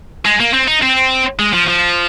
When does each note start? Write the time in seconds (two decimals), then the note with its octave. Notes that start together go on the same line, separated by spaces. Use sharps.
0.25 G#3
0.40 A#3
0.53 C4
0.67 D#4
0.82 C4
1.39 G#3
1.53 F3
1.68 F3